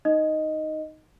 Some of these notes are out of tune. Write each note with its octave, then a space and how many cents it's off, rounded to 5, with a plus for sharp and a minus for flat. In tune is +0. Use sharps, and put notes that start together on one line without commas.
D#4 +0 D#5 +0